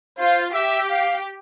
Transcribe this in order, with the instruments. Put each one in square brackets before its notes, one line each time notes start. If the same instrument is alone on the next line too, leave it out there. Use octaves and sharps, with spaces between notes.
[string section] F4 [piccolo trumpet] C5
[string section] G4 [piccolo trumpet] E5
[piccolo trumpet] F5